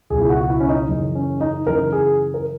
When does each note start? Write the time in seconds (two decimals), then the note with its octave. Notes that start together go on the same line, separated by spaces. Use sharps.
0.10 C#2 B2 F#3 G#4
0.21 E4
0.29 F#4
0.41 F#4
0.50 E4
0.60 C#4
0.69 D#4
0.89 F#2 C#3 E3
1.15 C#4
1.41 D#4
1.67 F#2 C#3 E3 A#4
1.92 G#4
2.34 A#4